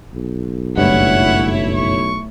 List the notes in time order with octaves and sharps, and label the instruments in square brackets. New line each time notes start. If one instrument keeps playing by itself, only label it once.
[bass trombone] B1
[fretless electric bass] F#1 G2 [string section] A3 E4 C#5 [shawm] F#5
[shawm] C#6